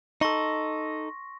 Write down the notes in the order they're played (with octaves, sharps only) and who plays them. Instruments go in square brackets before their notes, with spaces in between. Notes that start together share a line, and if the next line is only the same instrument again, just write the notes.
[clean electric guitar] D#4 A4 [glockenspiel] C6 C#6 A#6